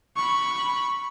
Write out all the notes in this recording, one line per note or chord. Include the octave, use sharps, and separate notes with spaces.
B5 C#6